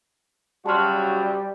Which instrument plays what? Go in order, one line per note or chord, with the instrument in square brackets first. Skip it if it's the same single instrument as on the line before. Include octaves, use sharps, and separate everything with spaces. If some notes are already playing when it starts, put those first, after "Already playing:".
[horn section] C#3 F#3 F#4 [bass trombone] G3 [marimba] A5 C6 F6